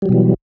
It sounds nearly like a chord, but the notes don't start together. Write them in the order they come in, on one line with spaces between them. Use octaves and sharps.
G3 F#3 B2 E3